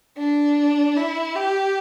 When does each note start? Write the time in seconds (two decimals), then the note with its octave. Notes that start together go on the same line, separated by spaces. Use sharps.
0.18 D4
0.97 E4
1.35 G4